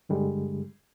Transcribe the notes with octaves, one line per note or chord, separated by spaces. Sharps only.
G2 D3 G3 G#3